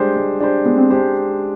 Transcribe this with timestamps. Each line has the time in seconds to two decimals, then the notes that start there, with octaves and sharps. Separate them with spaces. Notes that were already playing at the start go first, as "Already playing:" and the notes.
Already playing: G3 G#3 D4 G4 C5
0.16 G#3
0.40 D4 G4 C5
0.65 G#3 B3
0.78 C4
0.90 G#3 D4 G4 C5